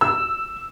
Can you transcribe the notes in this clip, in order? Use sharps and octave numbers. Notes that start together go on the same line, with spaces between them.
E6